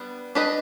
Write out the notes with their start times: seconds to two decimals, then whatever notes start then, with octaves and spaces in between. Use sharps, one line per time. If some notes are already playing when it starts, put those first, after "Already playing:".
Already playing: G3 B3 D4
0.35 D4 G4 B4 D#5